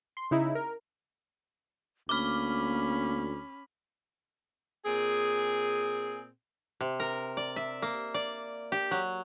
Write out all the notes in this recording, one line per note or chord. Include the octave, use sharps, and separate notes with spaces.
C6
C#3 D#4 E4
A#4
D2 A#3 C#4 B5 D6 F6
A#2 C4 G#4
C3
A#4
D5
E5
A#3
D5
G4
F#3